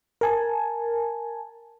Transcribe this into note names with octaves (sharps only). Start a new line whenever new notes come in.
A#4 G#5 A5